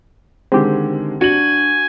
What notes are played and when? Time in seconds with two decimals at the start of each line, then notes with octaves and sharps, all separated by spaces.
0.52 D3 D#3 G#3 C4 G4
1.21 D4 F#4 G#5 F#7